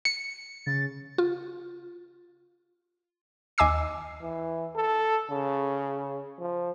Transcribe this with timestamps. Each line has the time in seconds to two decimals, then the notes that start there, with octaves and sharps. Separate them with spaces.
0.05 C#7
0.67 C#3 A6
1.18 F4
3.58 D#2 D#5 G#5 D6 E6 C7
4.22 E3
4.76 A4
5.30 C#3
6.39 F3